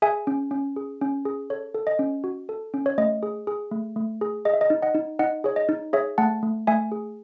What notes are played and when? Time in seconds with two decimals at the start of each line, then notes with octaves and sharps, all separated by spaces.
0.02 G#4 E5 G#5
0.27 C#4
0.51 C#4
0.76 G#4
1.01 C#4
1.25 G#4
1.50 A4 C#5
1.75 A4
1.87 D#5
1.99 C#4
2.24 F#4
2.49 A4
2.74 C#4
2.86 C#5
2.98 A3 D#5
3.23 G#4
3.47 G#4
3.71 A3
3.96 A3
4.21 G#4
4.45 G#4 D#5
4.53 E5
4.61 D#5
4.70 D#4
4.82 D#5 F#5
4.95 D#4
5.19 D#4 D#5 F#5
5.44 G#4 C#5
5.56 D#5
5.69 D#4
5.93 G#4 C#5 E5
6.18 A3 F#5 A5
6.43 A3
6.67 A3 E5 G#5
6.92 G#4